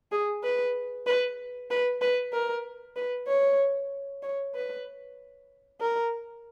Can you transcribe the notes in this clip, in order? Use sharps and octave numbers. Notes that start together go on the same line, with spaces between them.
G#4
B4
B4
B4
B4
A#4
B4
C#5
C#5
B4
A#4